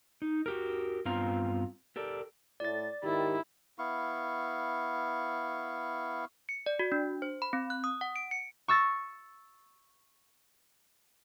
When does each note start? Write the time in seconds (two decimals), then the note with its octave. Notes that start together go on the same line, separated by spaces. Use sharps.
0.22 D#4
0.46 F#4 G4 A#4
1.05 G2 B3 C4 F4 F5 A#5
1.96 G4 A4 A#4 D5
2.60 A2 D5 A6
3.03 D#2 G#2 D#3 E4 G4
3.78 B3 E4 F5 C#6
6.49 C#7
6.66 D5
6.79 F#4
6.92 D4
7.22 C5
7.42 B5
7.53 C4
7.70 F#6
7.84 D#6
8.01 F#5
8.16 D7
8.31 C#7
8.68 C#6 E6 A6 A#6